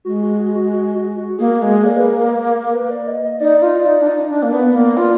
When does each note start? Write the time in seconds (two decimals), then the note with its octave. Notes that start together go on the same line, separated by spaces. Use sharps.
0.05 G#3 F#4
0.22 F#4
0.39 F#4
0.55 F#4
0.72 F#4
0.95 F#4
1.17 F#4
1.39 A#3 G#4
1.62 G#3
1.83 A#3 D5
1.96 B4
2.06 A#4
2.74 B4
2.91 D5
3.07 D#5
3.24 D#5
3.40 D#4 D5
3.62 F4
3.86 D#4
4.01 D4
4.07 D#4
4.30 D4
4.43 A#3
4.52 B3
4.75 A#3
4.97 F4